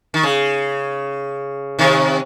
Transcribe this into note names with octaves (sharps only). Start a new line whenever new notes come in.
D#3
C#3
C3 D#3